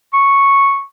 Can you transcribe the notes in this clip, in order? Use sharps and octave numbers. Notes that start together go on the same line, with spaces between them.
C#6